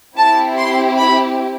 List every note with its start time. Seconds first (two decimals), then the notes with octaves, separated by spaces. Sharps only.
0.17 C4 E4 G4 A5
0.57 C6
0.97 B5